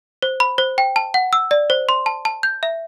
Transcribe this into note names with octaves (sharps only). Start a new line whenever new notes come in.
C5
B5
C5
G5
A5
F#5
E6
D5
C5
C6
A5
A5
G6
E5